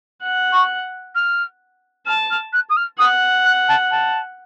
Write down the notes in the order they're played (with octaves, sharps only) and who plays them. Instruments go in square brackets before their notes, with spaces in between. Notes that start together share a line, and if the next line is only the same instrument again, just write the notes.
[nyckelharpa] F#5
[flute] C#6
F6
[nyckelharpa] A5 [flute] F6
[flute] F6
F#6
D#6
F6
[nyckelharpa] F#5 [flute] D#6
[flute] F#6
A5
A5